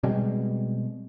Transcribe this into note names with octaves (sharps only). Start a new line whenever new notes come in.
B2 G3 G#3 C4